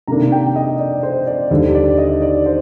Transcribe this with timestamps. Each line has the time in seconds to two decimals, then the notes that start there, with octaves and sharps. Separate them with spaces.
0.08 C3 D#3 A#3 D4 A#5
0.32 G5
0.56 D#5
0.79 D5
1.03 C5
1.27 D5
1.50 D#2 D3 G3 D4 C5
1.75 D5
1.98 D#5
2.22 D5
2.46 C5